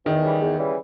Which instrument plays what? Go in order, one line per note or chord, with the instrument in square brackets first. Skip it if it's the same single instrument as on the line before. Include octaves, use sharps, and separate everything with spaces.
[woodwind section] E2 [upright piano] D#3
[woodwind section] C#3 E3 G3
E2
C#3 E3 G3